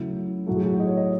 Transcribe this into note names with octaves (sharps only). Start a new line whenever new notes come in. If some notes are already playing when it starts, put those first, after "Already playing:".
Already playing: C#3 F#3 A3 E4
A2 F#3 A3 F#4
G#4
F#4
D#5
C#5
D#5